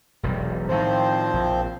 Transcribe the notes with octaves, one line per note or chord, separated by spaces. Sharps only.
E1 B1 G3
A2 D#3 F3 C4 C5
A#1